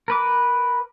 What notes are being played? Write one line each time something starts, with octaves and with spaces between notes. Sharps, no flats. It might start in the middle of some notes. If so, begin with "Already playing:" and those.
A#4 B4 D6